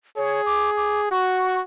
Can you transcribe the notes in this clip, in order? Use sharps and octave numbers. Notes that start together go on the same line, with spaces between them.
G#4 C#5
D6
D6
F#4 C#6